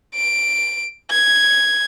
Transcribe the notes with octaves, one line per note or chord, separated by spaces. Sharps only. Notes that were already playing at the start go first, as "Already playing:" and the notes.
D7
G#6